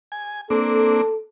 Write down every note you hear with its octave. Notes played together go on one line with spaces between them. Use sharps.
G#5
A#3 C4 D4 A4